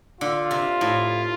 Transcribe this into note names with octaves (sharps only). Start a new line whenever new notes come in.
D3 F4
C3
A2